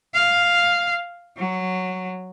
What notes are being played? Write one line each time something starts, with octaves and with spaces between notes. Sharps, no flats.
F5
F#3